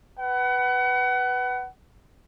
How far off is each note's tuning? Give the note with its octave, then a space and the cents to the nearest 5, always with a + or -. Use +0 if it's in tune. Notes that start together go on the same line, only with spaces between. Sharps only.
B4 +0 F#5 +30